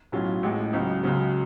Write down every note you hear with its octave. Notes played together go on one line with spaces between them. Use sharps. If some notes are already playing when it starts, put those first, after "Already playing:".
B1 A2 F#3 C#4 F4
A1 A2 G#3
C#2 C#3 F#3
C#2 C#3 F#3